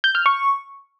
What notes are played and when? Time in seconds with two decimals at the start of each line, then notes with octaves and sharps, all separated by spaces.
0.04 G6
0.15 F6
0.26 C#6